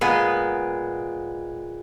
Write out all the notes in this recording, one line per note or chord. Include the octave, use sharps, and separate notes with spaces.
A#2 G#3 B3